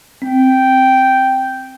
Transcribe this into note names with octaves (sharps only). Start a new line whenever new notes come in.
C4 G5